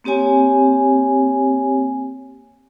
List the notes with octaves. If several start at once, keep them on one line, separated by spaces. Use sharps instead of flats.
A#3 C4 G4 C#5 G#5